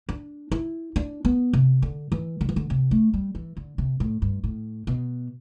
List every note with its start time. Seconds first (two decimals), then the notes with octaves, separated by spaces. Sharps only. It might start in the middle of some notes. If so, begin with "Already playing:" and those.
0.09 D4
0.52 E4
0.96 D4
1.25 B3
1.53 C3
1.82 D3
2.12 E3
2.41 D3
2.49 E3
2.56 D3
2.70 C3
2.91 A3
3.14 G3
3.35 E3
3.57 D3
3.78 C3
4.00 A2
4.22 G2
4.44 A2
4.87 B2